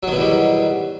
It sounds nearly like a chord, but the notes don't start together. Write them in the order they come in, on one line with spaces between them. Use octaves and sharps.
F#3 D#3 B2 E2 G3